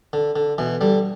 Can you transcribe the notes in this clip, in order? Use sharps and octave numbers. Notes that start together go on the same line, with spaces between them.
D3
D3
B2 E3
D3 G3